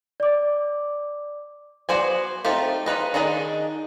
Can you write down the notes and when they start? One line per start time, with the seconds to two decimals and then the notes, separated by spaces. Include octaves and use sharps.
0.20 D5 D6
1.89 B3 F#4 C5 D5 G#5
2.45 A3 C4 D#4 F4 G4
2.86 D#4 F4 B4 D#5
3.14 D#3 D4 D#4 G#4 D#5